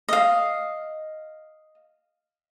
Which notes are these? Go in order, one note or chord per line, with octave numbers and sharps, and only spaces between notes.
D#5 F5